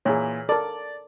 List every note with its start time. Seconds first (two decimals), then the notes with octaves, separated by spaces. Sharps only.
0.05 A#2 E3 G#4 C#5
0.49 A4 A#4 D5